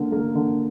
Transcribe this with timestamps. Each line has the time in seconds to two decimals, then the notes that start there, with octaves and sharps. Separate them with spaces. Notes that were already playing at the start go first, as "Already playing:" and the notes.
Already playing: D3 A#3
0.12 A#3
0.35 D3